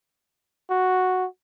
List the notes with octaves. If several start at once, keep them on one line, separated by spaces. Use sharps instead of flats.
F#4